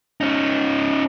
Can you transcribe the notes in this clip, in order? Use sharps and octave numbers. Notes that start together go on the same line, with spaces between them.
C#4 D#4